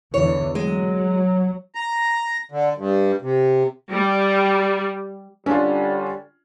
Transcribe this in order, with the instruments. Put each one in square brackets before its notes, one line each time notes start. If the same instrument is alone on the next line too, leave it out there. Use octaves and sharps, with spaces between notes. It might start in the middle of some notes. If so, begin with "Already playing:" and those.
[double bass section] E2 D3 E3 [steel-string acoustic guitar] C#5
[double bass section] F#3 [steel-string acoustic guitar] G#3
[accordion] A#5
D3
G2
C3
[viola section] G3
[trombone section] D3 G3 [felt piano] C#4 D4 F4